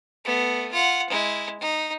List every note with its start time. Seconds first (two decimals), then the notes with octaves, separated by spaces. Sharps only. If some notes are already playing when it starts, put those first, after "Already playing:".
0.25 A3 B3
0.72 F4 F#5
1.10 G#3 E4
1.60 D#4